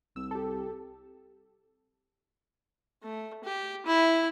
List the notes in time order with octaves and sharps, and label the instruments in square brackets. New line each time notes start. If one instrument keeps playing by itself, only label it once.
[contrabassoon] C2 [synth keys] E6
[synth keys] G4 A4
[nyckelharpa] A3
G4
E4